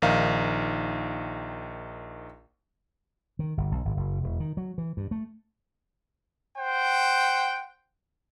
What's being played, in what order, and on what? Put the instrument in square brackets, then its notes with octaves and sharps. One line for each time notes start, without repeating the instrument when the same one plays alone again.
[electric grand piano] A#1 D#3 D#4 F5
[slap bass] D#3
G1
B1
G#1
F#1
E1
D#3
F#3
E3
G2
A3
[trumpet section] C5 F#5 G5